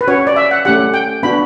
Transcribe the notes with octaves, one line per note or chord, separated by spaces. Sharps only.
B4
C#4 F#4 C#5
D5
E5
F#5
A3 C#4 G4 F#5
G5
B3 D4 F#4 B5